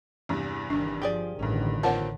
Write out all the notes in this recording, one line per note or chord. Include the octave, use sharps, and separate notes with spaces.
E2 G2 C3
G1 D#3 D4
F3 G4 G#4 D5
A1 G2 D3 D#3 C#4
A#3 C4 F4 C#5 F#5 A5